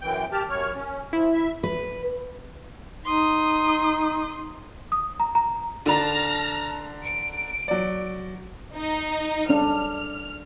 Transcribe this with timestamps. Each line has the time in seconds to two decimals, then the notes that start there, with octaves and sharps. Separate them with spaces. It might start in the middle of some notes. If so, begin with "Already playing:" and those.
0.01 F#2 E3 G5
0.32 G4 A5 F6
0.50 F#2 C#5 F6
0.75 C#4
1.13 F3 E4
1.34 E5
1.63 B4
3.05 D#4 C6 D#6
4.92 D#6
5.20 A#5
5.35 A#5
5.86 D3 D4 A5 A#5 F6 A#6
7.04 D7
7.68 F#3 D5
8.75 D#4
9.49 C#4 D4 F6